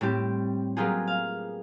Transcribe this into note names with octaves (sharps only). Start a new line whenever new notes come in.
A2 G3 C4 G4
F#3 A#3 B3 F4 G4 G#4
F5